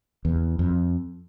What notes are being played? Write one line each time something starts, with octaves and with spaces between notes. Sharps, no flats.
E2
F2